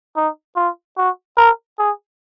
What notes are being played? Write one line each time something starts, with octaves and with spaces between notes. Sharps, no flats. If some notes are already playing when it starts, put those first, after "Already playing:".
D#4
F4
F#4
A#4
G#4